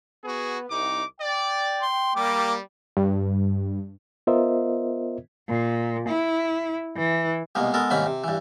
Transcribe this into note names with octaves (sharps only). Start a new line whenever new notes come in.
B3 F#4 G#4
C2 D#4 D6
D5 G5
C6
G3 A#3 D6
G2
B3 F4 A#4 C5 D#5 E5
A#2
E4
E3
C2 B2 G#3 A#3
G#3 B3 A4 A#4
C2 G#2 D#3 A#3 C#4 B5
C3
G2 E3